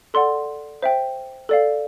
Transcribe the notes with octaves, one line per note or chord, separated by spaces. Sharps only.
A4 D5 F#5 C6
C5 E5 G5
A4 D5 F5